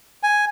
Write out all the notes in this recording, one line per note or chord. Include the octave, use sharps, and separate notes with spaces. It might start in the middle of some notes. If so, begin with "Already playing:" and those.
G#5